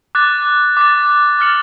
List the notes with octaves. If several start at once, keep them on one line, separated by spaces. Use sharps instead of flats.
D6 F#6 A6
D6 F#6 A6
D6 F6 A6 C#7 F#7